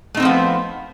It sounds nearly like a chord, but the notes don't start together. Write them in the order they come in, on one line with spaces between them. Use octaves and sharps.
A3 D#4 C4 F3 B3